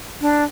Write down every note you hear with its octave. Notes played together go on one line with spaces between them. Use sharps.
D4